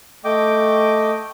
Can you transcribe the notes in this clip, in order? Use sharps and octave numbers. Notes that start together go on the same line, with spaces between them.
A3 D#5 G5 D6